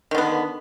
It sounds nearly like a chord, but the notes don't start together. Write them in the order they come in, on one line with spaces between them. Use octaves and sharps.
D#3 D3 B3